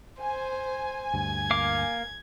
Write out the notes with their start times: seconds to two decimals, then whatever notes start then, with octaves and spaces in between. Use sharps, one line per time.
0.22 C5 G#5
1.14 D2 G2 G#6
1.51 A#3 F5 D6